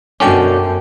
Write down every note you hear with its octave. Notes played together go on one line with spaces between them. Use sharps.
F#2 B2 D3 C#4 G5 A5 D6